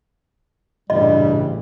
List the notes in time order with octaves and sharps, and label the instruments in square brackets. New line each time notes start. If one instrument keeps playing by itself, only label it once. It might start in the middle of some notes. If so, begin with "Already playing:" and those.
[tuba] A1 [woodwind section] G2 A#2 C#3 [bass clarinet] G3 [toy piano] D#5